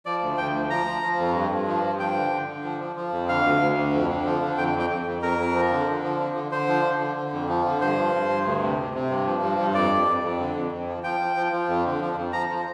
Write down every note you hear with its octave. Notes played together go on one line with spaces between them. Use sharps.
F3 D5
D2
D2 G5
F3
F3 A#5
F3
F3
F2
G2
G2
F3
G2
F3 G5
D3
D3
D3
F3
F3
F3
F2
D3 F5
D2
D2
D3
F2
D3
F3
D3
F2 G5
F2
G5
F2
F2
F2 A#4
F2
F3
D3
D3
F3
D3
D3
D3 C5
F3
D3
D3
D3
F2
F3
D3
G2 C5
F3
G2
G2
D2
C3
C3
C3
G2
F3
G2
G2
F2 D5
F2
F2
F2
D3
F2
F2
F3
F3 G5
F3
F3
F3
F2
D3
F3
F2
F3 A#5
F3